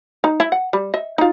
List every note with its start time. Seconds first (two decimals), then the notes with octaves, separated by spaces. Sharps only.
0.24 D#4
0.40 E4
0.52 F#5
0.73 G3
0.94 D#5 E5
1.18 D#4 F4